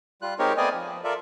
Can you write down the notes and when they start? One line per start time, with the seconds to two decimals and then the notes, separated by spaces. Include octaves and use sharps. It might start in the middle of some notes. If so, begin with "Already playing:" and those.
0.22 G3 F4 F#6
0.39 G#3 C4 D#4 G4 A#4 C#5
0.57 A3 B3 C4 D5 D#5 G#5
0.74 F3
1.04 F4 A4 A#4 D5 E5